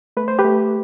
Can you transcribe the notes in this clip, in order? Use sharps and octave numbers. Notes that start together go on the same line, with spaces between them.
A3 B4
C5
G4 B4
A3